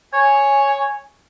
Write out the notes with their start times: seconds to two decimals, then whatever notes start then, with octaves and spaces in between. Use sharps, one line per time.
0.13 C#5 G#5